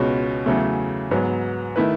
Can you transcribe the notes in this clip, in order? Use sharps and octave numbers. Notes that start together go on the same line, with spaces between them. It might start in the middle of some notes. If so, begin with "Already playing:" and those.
Already playing: C#2 B2 G#3 C#4 F#4
E2 C#3 F#3 A3
G#2 F#3 B3
D#3 A3 E4 B4